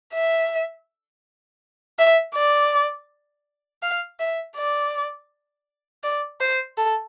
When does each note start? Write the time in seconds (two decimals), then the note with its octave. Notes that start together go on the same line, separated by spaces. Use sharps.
0.14 E5
1.99 E5
2.35 D5
3.82 F5
4.20 E5
4.57 D5
6.03 D5
6.41 C5
6.77 A4